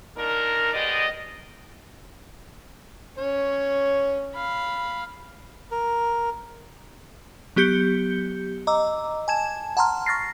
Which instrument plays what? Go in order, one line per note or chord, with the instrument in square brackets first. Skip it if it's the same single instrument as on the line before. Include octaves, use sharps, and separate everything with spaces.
[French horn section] A#2 D4 D#4 A#4
G#3 B3 G4 D5 D#5
[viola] C#4 [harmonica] C#5
[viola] F5 B5
[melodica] A#4
[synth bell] F#3 B3 G4 G6 C#7 G7
D#5 A#5 D6 E6
G#5 A5 G#6 E7
F#5 A5 A#5 C6 F6
C#6 F6 A6 A#6 C7